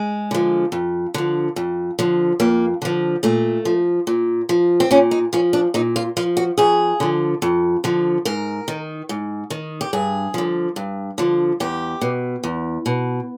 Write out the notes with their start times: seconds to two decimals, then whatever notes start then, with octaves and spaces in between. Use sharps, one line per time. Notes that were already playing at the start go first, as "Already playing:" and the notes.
Already playing: G#3
0.31 D3 F3
0.72 F2
1.14 D3 F3
1.56 F2
1.99 D3 F3
2.40 F2 A#3
2.82 D3 F3
3.23 A#2 A3
3.65 F3
4.07 A#2
4.49 F3
4.80 C4
4.91 A#2 C#4
5.11 D#4
5.33 F3 C#4
5.53 D4
5.74 A#2 D#4
5.96 F4
6.17 F3 F4
6.37 F#4
6.58 F2 G#4
7.00 D3 F3
7.42 F2
7.84 D3 F3
8.25 G#2 A#4
8.68 D#3
9.09 G#2
9.50 D#3
9.81 G4
9.93 G2 G#4
10.34 D3 F3
10.76 G2
11.18 D3 F3
11.60 E2 G4
12.01 B2
12.44 E2
12.86 B2